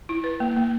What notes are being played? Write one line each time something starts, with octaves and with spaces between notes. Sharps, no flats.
E4
B4
A#3
A#3